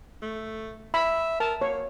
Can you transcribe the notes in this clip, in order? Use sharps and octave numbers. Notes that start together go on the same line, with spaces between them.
A3
E5 B5
A#4 A5
A#3 C#5